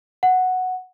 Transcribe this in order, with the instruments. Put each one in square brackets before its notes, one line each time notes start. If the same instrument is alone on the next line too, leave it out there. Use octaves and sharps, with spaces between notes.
[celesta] F#5